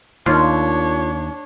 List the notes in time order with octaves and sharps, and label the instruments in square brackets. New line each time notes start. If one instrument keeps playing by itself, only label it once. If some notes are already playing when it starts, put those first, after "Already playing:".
[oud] D#2 [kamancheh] D4 C#5 [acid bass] F4